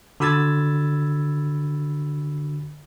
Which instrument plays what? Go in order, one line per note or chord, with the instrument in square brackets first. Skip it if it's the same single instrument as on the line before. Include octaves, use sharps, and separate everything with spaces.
[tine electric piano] D3 F#4 B5 E6 G#6 A6